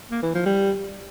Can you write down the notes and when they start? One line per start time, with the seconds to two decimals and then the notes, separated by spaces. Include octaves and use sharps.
0.11 A#3
0.23 E3
0.34 F3
0.46 G3